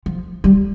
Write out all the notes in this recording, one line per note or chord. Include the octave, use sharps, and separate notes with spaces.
F3
G3